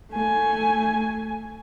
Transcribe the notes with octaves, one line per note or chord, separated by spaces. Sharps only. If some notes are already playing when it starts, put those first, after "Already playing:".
A3 G#5